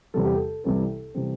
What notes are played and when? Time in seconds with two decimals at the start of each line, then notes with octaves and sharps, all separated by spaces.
0.14 E2 C3 G3 A4
0.25 G4
0.35 A4
0.64 C2 C3 E3 G3 C4 A4
1.14 C3 E3 G3 C4